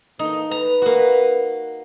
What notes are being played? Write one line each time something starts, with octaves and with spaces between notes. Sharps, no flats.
E3 A#3 D#4 A4
B4 A#5
A#3 F#4